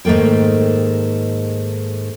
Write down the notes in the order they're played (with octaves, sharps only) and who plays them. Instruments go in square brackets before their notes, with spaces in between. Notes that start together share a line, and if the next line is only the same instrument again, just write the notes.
[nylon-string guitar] G#2 D#3 A3 A#3 G5